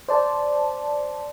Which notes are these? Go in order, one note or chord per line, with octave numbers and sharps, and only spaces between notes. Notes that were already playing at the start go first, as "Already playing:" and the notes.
C5 D5 A5